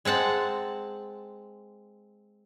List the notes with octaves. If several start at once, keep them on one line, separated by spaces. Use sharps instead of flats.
G#3 C4 F#5 A5